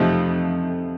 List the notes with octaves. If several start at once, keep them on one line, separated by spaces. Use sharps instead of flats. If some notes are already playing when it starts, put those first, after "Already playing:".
Already playing: F2 C3 F3 A3 D#4